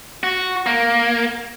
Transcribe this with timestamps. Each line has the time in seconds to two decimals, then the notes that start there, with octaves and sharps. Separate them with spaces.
0.23 F#4
0.66 A#3